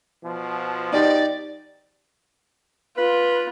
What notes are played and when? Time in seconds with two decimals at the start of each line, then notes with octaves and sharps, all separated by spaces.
0.24 B2 F3
0.92 D#4 G4 D5
2.97 F4 B4